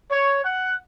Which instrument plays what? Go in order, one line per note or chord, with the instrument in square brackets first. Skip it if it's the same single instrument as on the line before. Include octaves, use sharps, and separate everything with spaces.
[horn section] C#5
F#5